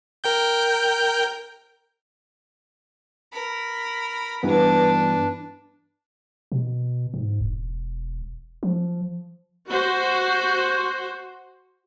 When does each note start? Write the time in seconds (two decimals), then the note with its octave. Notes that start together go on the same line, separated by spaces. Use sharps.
0.24 A#4 G5 G6
3.32 A#4 B5
4.43 G2 E3 B3 D4 B4
6.52 B2
7.14 G#2
7.41 E1
8.63 F3
9.69 F#4 C5